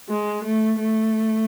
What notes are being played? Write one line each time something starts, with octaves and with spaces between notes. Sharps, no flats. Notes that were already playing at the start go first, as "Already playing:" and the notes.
G#3
A3
A3